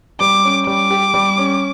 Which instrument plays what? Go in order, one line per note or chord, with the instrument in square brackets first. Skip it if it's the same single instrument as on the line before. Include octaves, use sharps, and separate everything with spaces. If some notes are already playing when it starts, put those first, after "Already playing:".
[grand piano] G3 [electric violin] D6
[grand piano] C#4
[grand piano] G3 [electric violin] D6
[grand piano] G4
G3
C#4